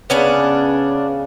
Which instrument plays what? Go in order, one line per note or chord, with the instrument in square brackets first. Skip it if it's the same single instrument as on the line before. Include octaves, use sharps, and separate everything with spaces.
[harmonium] C#3 [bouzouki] B3 C#4 D4